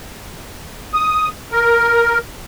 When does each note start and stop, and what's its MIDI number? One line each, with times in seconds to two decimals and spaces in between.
0.94 1.29 87
1.52 2.18 70